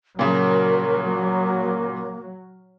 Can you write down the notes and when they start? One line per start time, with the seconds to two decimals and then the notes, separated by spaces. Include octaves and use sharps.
0.19 A#2 C#3 F#3 A#4
1.05 A#3